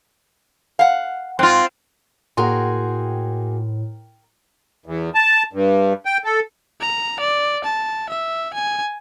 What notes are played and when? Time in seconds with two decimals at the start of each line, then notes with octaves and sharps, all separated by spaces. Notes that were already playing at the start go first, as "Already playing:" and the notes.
0.79 F5 F#5
1.39 G#2 C4 F4
2.37 A2 A#3 F#4 G#4 A#4 G5 C6
4.86 E2
5.15 A5
5.53 G2
6.05 G5
6.24 A4
6.81 A#5
7.20 D5
7.65 A5
8.10 E5
8.54 G#5